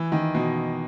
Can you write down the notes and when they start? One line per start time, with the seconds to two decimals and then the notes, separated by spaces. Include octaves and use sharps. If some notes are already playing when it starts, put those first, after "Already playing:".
Already playing: E3
0.12 D#3
0.35 B2